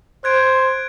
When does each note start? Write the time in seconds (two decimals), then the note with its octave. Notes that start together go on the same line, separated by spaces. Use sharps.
0.24 C5 F#6 G#6 D7